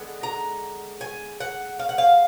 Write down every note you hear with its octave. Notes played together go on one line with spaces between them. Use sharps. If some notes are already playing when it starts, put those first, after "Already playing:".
Already playing: D3 G#3 B3
A#5
G#5
F#5
F5
F#5
F5